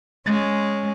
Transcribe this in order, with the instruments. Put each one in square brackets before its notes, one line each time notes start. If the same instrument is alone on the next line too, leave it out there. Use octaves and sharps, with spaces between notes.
[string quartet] G#3 C#4